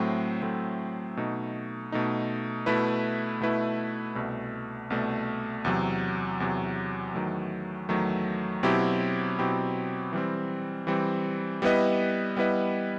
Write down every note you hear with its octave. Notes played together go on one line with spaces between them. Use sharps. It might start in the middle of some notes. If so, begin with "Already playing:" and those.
Already playing: A2 F#3 A3 C4
A2 F#3 A3 C4
B2 A3 D#4
B2 A3 D#4
B2 A3 E4 B4
B2 A3 E4 B4
C2 B2 A3
C2 B2 A3
E2 C3 F#3
E2 C3 F#3
E2 D#3 F#3 A3
E2 D#3 F#3 A3
B2 F#3 C4 E4 G4
B2 F#3 C4 E4 G4
E3 G3 C4
E3 G3 C4
G3 B3 E4 B4 D#5
G3 B3 E4 B4 D#5